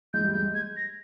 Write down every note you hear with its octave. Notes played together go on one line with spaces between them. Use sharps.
G#3 G6
G3
G#3 G6
G#6
A#6